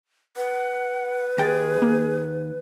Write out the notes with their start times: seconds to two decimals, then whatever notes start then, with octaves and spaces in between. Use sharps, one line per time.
0.37 B4 F#5
1.38 D#2 G#4 G5 A6
1.78 D#3 A#3